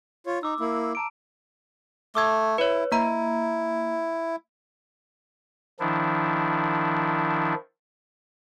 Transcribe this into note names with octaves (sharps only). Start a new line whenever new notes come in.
F4 C#5
D#4 D6 E6
A#3 E4
A5 A#5 D7
A3 D6 E6 G#6
E4 B4 C#5
A#3 E4 A#5
D#3 F3 D4 E4